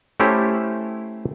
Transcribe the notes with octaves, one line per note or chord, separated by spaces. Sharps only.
A3 C#4 E4 G4 C5